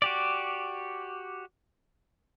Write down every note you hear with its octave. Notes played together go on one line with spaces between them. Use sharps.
F#4 G4 D5